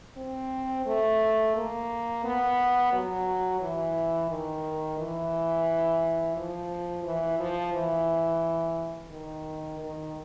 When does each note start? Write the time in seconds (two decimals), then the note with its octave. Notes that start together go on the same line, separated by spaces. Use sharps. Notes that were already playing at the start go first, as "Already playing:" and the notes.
0.17 C4
0.86 A3
1.55 A#3
2.24 B3
2.92 F#3
3.61 E3
4.29 D#3
4.98 E3
6.36 F3
7.04 E3
7.39 F3
7.74 E3
9.11 D#3
9.79 D#3